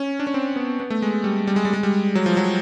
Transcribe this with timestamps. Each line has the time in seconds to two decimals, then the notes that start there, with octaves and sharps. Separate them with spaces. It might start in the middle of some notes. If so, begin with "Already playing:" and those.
Already playing: C#4
0.20 D4
0.27 C#4
0.34 C4
0.56 B3
0.80 B3
0.90 A3
1.02 G#3
1.24 G3
1.47 G3
1.56 G#3
1.65 G3
1.73 G#3
1.83 G3
2.15 F#3
2.26 F3
2.37 F#3